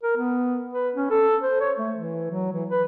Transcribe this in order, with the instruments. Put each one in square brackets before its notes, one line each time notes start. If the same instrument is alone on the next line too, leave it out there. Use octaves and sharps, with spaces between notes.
[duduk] A#4
B3
B4
C#4
A4
C5
C#5
A3
E3
F#3
E3
B4